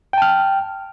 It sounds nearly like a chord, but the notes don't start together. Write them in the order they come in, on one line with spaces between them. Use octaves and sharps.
G5 A5 F6